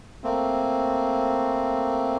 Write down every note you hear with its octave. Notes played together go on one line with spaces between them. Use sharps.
A3 A#3 C4